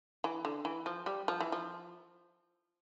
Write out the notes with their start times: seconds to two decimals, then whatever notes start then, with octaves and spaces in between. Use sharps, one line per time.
0.24 E3
0.45 D3
0.65 E3
0.86 F3
1.06 G3
1.28 F3
1.41 E3
1.52 F3